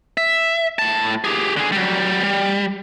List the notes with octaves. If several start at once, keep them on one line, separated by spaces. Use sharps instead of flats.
E5
A2 A5
G4 G#4
D3 G#4
F#3 G3
G3